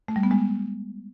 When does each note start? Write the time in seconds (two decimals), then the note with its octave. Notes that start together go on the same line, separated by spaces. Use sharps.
0.08 A3
0.16 G3
0.23 B3
0.31 G#3